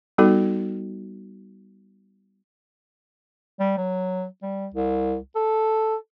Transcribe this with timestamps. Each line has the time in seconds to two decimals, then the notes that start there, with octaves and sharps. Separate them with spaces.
0.18 G3 B3 D#4 F#4 A4
3.60 G3
3.78 F#3
4.42 G3
4.74 C2
5.36 A4